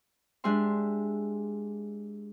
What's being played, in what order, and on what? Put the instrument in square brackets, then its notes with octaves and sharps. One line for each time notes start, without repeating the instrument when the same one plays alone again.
[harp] G#3 D4 G4 E5 C6